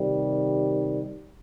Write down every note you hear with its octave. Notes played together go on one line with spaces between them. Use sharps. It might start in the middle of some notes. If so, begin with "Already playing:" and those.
Already playing: C3 D#3 G3